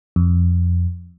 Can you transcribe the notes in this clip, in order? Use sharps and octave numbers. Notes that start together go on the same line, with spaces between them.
F2